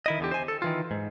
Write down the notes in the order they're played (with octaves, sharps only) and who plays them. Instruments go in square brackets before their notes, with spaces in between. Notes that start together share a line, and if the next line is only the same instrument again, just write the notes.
[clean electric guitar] D#3 E4 D#5
E2 D3 G4
C5 G#5
A4
D#3 E3 F4
G#2